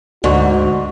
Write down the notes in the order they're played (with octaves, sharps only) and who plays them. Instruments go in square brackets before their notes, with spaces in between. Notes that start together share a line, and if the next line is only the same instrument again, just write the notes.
[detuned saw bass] D2 [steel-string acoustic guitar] G#2 [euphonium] F#4 [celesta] D5 C#6